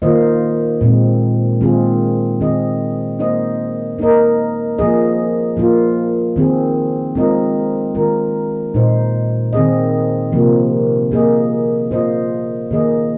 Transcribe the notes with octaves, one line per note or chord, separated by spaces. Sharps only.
D#3 A#3 F4 C5 D#5
A#2 G#3 C4
D#3 G#3 C4 F4 G#4
D#3 C4 G#4 D#5
A#3 D#4 C5 D#5
A#3 D#4 A#4 D#5
F3 A#3 G#4 D#5
F3 A#3 F4
D#3 C4 G#4
G#3 C4 F4 A#4 D#5
D#3 G#3 F4 A#4
A#2 G#3 D#4 C5
D#3 C4 G#4 D#5
C3 F3 A#3
A#3 G#4 D#5
A#3 F4 C5 D#5
D#3 A#3 G#4 D#5